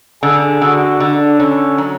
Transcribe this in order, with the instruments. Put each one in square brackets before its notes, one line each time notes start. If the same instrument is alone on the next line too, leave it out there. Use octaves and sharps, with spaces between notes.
[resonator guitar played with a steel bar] D3 [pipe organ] G#4
[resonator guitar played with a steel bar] D3 [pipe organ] F#4
[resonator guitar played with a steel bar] D3 [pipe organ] D4
[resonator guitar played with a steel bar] D3 [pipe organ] C#4
[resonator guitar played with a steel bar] F#3